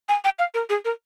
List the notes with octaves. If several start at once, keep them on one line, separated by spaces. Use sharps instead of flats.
G#5
G5
F5
A#4
G#4
A#4